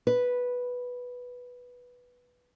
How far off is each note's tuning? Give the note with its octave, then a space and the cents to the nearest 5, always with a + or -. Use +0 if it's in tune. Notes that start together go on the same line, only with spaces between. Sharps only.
B4 -5